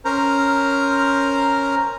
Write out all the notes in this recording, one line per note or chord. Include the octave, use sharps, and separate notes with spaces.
C#4 A#4 C5 A#5